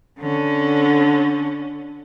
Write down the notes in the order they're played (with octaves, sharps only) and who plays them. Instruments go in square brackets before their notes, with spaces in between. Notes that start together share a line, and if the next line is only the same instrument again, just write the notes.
[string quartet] D3 C#4